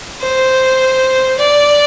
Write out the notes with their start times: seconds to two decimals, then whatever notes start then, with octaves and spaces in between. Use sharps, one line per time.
0.21 C5
1.38 D5